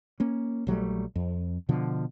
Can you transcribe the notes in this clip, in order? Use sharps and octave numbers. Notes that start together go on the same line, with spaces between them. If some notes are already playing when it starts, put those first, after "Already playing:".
A#3 C#4
A#1 F#3 G3 A3
F2
B2 D3 F3